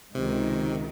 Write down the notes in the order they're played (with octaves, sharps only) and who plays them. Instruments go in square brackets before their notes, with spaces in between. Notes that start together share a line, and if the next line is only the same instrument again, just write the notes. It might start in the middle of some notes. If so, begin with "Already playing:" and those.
[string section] C#2 D#3 [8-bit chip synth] C3